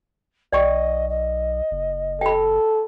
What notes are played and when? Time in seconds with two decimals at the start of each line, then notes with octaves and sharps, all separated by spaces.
0.52 B1 D5 D#5 G5 C#6
1.09 D#5
1.71 F#1
2.21 A4 G5 B5